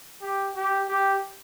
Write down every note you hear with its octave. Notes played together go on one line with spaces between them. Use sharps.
G4
G4
G4